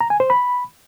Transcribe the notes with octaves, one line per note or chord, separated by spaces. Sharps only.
A#5
G#5
C5
B5